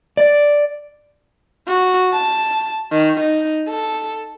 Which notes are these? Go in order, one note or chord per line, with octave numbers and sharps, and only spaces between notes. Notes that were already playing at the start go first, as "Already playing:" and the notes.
D5
F#4
A5
D#3
D#4
A4